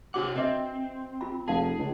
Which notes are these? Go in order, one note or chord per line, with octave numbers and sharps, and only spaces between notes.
C3 D4 F#4 C#5 F#5 D6
C4 B4 D#5 E5
F4 B5
F1 G#4 F5 A5
C#2